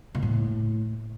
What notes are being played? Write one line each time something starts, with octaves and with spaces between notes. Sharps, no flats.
B2
A2